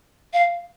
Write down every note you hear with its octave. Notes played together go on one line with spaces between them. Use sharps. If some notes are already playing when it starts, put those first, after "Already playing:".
F5